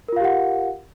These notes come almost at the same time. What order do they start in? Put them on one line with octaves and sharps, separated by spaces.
A#4 F4 F5 G4 F#5